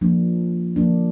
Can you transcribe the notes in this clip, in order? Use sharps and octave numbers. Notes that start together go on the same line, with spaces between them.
F3 A#3 D4
F3 A#3 D4